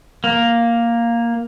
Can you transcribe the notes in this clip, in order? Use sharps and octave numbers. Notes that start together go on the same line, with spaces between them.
A#3